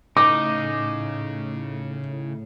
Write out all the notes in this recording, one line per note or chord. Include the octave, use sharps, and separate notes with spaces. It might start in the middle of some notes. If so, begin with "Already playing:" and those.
A2 C#3 D#4 D6